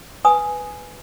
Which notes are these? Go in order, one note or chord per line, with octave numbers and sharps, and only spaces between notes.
B4 G#5 D#6